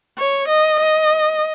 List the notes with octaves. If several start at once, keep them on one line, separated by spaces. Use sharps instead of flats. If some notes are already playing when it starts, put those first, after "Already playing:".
C#5
D#5
D#5